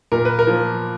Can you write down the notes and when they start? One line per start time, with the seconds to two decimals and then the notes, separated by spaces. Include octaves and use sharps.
0.12 A#2 A#4
0.25 B4
0.39 A#4
0.47 F3 A#3